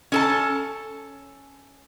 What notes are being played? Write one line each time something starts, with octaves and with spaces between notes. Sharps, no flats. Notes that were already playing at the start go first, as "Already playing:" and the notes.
C#4 A4 A5